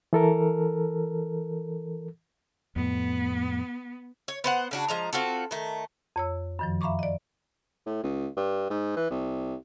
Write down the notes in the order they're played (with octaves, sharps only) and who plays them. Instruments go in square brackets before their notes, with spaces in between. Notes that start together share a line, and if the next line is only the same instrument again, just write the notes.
[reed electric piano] E3 A4 A#4
[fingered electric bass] F2 A2 [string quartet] B3
[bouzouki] C#5
B3 C5 F#5
C#3 D4 F#4
F3 G#3 A#5
C4 F4 F#4 A4
D#3 A3
[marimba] F2 C#5 E6
F#2 D#3 F3
E5 F5 A#5 B5 C#6 D6
D5 D#5
[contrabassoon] A2
C#2
G2
G#2
E3
C2